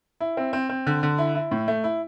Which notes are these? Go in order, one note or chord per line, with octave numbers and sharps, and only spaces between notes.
E4
C4
C4
C4
D3
D3
E4
E4
A2
A3
E4